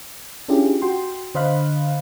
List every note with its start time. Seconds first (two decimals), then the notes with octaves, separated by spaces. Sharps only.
0.49 C#4 D4 E4 F4 G4 G#4
0.82 F#4 G5 C6
1.35 D3 C5 D#5 F5 B5 F#6